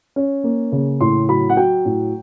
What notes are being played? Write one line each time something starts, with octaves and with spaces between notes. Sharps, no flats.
C#4
A#3
C#3
A2 C6
F#3 B5
F#5
F#3 G5
A2